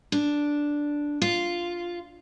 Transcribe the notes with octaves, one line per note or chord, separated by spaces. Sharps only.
D4
F4